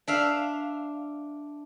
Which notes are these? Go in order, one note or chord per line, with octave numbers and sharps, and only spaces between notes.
D4 E5 F5